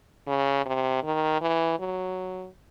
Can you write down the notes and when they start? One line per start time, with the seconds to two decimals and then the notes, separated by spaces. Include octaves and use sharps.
0.27 C#3
0.65 C3
1.03 D#3
1.41 E3
1.79 F#3